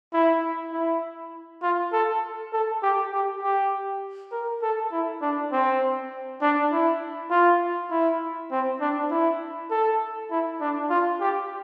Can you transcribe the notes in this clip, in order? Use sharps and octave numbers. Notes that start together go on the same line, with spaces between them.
E4
E4
F4
A4
A4
G4
G4
G4
A#4
A4
E4
D4
C4
D4
E4
F4
E4
C4
D4
E4
A4
E4
D4
F4
G4